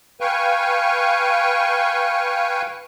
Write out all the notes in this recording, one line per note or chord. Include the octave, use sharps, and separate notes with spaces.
B4 F5 G5 G#5 C#6